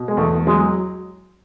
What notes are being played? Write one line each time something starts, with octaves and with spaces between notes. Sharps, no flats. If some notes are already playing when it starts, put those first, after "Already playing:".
Already playing: B2
G#3
E2 A3
F#3 G#3